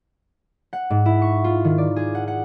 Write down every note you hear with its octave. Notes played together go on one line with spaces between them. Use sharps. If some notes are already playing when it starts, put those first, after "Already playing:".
F#5
G#2
E4
C#6
F4
D#3
D5
G#4
F#5
F#5